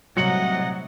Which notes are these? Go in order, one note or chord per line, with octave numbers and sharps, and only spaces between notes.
A2 C3 F#3 G3 D#5 F#5 C#7 F#7